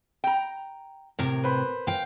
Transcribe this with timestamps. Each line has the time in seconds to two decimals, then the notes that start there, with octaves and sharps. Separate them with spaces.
0.24 G5 A#5
1.19 A2 C3 A#4
1.44 B4 C5 B5
1.87 F5 G5